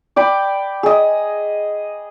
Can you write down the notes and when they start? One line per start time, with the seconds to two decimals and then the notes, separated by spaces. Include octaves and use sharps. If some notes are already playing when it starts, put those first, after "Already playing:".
0.16 D5 G5 B5
0.83 G#4 D#5